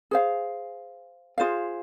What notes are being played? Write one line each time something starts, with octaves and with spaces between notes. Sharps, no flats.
G#4 C5 F5
F4 G#4 C5 F5